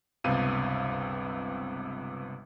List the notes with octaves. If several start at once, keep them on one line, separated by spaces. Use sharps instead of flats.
G1 C#2 C3 B3 F5 D#7